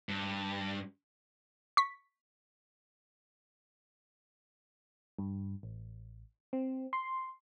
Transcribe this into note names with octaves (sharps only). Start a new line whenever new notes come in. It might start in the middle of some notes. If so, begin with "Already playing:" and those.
G2
C#6 B6
G2
A1
C4
C6